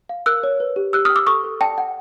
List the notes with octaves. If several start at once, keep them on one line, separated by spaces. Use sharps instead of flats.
F5
A#4 E6 F#6
C#5
B4
G4
G4 E6 F#6
G5 D#6 F6
D6 E6
A4 C#6 D#6
A4
D5 G5 A5
F#5